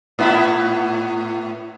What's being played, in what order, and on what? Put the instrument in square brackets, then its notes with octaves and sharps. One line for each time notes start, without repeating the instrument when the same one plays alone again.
[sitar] A2 B3 E4